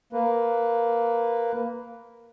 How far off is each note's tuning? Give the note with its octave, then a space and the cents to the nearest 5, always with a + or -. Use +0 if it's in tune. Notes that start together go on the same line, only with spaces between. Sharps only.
A#3 +0 B4 +0